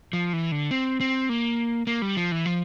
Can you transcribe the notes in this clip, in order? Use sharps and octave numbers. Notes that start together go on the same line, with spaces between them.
F3
E3
D3
C4
C4
A#3
A#3
G3
F3
E3
F3